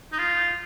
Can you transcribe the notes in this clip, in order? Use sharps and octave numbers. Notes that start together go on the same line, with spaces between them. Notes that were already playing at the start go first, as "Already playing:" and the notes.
D#4
F4